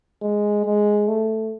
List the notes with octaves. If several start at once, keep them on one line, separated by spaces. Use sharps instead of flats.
G#3
G#3
A3